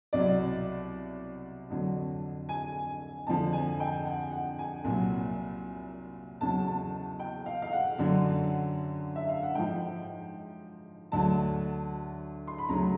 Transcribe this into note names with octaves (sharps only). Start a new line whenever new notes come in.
C2 B2 F#3 D5
F2 D3 F#3
G#5
F2 D3 F3 A5
G#5
G5
F#5
F#5
G#5
C2 A#2 F#3
E2 C#3 F#3 A5
A5
G5
F5
F5
F#5
F#2 D3 F#3
E5
F5
F#5
G#2 F3 G5
D2 D3 F#3 A5
C6
B5
D2 C#3 F#3 A#5